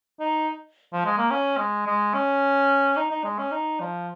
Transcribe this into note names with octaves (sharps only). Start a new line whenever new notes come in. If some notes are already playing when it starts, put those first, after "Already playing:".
D#4
F3
G#3
A#3
C#4
G#3
G#3
C#4
D#4
D#4
G#3
C#4
D#4
F3